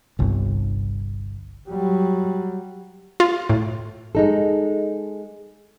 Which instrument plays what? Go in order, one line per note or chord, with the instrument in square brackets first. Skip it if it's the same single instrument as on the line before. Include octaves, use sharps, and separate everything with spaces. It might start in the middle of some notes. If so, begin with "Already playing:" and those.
[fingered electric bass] G1 C2
[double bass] F#3 G3
[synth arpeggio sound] F4
A2
[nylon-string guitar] G#3 D#4 A4